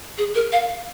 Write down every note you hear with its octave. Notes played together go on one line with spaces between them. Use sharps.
G#4
A#4
F5